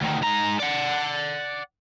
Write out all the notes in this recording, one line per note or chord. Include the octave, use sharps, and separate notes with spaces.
D2 D#3
G#2 A#5
D5 F#5